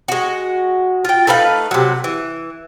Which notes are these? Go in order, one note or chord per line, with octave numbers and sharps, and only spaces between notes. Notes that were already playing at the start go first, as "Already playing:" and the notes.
G#3 F#4
F4 G5
A3 D#4 B4 F5
C3 F#3
E3